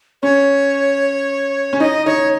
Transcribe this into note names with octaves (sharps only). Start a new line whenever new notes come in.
C#4 C#5
C#4
D#4 D#5
D#4 C#5